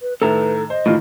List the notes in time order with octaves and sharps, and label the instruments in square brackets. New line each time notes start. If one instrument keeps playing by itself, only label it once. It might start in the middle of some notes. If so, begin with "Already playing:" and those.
[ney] B4
[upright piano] A2 D#3 A3 [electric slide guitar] A4 A#5 [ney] B4
[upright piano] C5 [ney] D#5
[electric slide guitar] A2 F4 [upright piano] D#3 E3